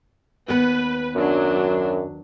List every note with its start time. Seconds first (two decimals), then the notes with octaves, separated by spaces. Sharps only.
0.48 D#2 B3 B4
1.15 F#2 F#3 D4